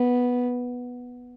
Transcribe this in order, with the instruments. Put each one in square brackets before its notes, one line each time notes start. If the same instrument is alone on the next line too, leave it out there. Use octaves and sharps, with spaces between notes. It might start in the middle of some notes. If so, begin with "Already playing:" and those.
Already playing: [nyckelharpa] B3